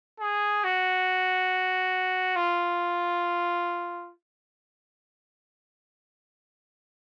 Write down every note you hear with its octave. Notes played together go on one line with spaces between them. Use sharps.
G#4
F#4
F4